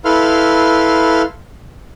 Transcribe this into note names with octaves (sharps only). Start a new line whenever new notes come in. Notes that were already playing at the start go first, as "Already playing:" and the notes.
E4 A4 B4 F5 C6 F6